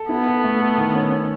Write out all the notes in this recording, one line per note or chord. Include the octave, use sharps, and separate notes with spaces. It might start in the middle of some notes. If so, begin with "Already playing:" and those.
Already playing: A4
B3 E4
A4
A3
A4
D#3
C#4
C#4